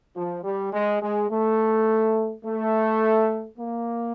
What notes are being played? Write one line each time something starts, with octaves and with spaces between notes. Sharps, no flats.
F3
G3
G#3
G#3
A3
A3
A#3